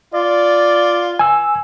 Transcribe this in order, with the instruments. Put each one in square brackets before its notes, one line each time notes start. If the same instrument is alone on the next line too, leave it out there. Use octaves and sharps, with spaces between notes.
[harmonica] F4 [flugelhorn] D5
[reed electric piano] G#5 E6